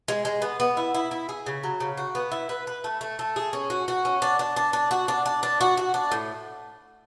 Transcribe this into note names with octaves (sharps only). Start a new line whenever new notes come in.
G#3
G#3
B3
B3
E4
E4
E4
G#4
C#3
F#3
C#3
F#4
B3
E4
B4
B4
A3
A3
A3
G#4
C#4
F#4
F#4
C#4
D4
D4
D4
D4
F#4
D4
D4
D4
F#4
F#4
D4
A2